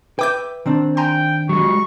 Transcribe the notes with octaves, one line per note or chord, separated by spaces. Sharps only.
B4 E5 G5 D6 G6
D#3 C4 D4
G5 G#5 A#5 C6
F#3 G#3 C#6